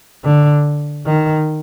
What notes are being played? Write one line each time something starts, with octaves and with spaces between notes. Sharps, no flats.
D3
D#3